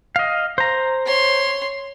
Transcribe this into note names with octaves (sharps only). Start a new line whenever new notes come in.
D#5 F5
C5 A#5
C#5 C6